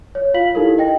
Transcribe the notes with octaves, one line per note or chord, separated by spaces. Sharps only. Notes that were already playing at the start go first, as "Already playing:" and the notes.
C#5
F4 F5 B6 F#7
D#4 E4 G4 A4 A#4
D#5 G5 A#6